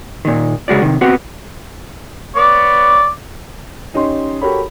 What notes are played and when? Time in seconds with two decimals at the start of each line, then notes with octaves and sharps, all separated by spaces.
0.25 A#2 D#3
0.68 C#3 G#3 F#4 D5
0.81 C3 D#3
1.01 B3 C4 F#4 G4
2.36 B3 C#5 D5
3.94 C#4 D#4 G4 C#5 C6
4.41 F#4 G4 A4 A#4 C#5 B5